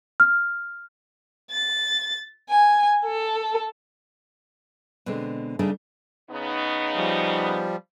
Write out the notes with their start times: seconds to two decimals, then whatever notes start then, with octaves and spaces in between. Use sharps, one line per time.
0.20 F6
1.50 A6
2.49 G#5
3.03 A4
5.06 B2 D3 G#3 C4
5.59 C#3 G3 A3 D4 D#4 G#4
6.30 C#3 B3 D#4
6.96 F3 G3